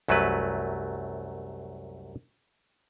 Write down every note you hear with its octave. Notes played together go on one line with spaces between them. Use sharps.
C2 F#2 F#3 A3 B4